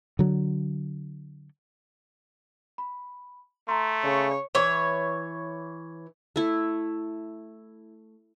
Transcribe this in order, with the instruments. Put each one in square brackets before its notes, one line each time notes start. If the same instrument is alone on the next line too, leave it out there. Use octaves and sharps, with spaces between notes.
[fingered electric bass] D3 F#3
[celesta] B5
[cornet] A3 [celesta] A#5 C6
[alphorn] C#3 [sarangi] C#5
[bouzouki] E3 C#5
[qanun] A3 E4